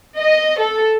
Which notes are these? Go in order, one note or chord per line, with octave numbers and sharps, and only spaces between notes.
D#5
A4